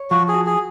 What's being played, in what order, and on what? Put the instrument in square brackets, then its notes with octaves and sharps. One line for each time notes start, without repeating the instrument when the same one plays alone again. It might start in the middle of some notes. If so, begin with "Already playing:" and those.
Already playing: [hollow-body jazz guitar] C#5
[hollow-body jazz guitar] F3 [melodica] F#4
[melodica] G#4
[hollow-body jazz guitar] F#4
[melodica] G#4